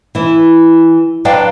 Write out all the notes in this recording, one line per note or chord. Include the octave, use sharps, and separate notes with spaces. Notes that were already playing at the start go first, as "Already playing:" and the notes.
E3 E4
F#3 D4 B4 D5 F5 G5